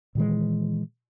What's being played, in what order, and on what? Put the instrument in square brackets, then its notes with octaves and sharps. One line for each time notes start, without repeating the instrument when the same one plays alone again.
[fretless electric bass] A#2 D#3 E3 G#3